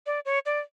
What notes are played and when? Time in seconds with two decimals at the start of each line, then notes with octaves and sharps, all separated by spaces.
0.06 D5
0.25 C#5
0.46 D5